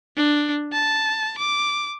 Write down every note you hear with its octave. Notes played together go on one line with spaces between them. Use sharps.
D4
A5
D6